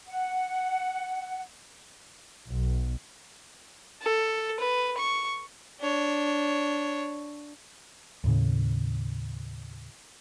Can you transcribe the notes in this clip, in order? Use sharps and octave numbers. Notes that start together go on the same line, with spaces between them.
F#5
B1
A4
B4
C#6
D4 C#5
D#2 A2 C#3